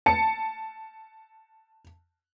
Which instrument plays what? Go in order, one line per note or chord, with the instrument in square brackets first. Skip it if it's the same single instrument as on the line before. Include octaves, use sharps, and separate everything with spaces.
[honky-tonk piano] A5 C#7